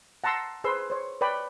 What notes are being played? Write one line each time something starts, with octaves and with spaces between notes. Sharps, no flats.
F#5 A5 A#5 C6 E6
G#4 B4 C5 C6 E6
C5 C#5
B4 C#5 D5 G5 B5